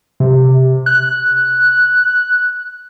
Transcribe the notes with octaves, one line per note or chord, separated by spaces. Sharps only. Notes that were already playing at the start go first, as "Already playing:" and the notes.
C3
F#6